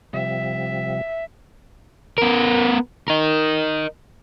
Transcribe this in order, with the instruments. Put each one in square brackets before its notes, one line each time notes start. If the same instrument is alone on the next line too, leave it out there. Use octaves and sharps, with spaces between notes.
[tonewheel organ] C3 F3 G3 [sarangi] E5
[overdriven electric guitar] B3 A#4
A#4 D#5